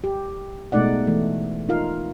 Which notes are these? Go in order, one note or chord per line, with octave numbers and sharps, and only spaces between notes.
G4
B2 G#3 A3 D#4 D5 F#5
E3 A3
D#4 F4 A#4 F5